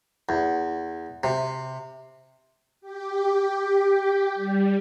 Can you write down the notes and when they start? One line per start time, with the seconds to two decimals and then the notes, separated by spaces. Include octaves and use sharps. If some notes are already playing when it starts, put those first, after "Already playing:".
0.29 E2
1.24 C3
2.81 G4
4.35 G3